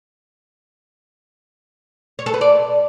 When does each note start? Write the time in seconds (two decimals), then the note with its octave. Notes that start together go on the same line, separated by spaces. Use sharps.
2.19 C#5
2.26 A4
2.34 B4
2.41 D5